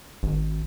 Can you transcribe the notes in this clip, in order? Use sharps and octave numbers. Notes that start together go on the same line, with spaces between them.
G#1